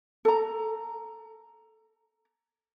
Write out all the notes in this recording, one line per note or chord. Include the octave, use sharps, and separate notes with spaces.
A4 A#5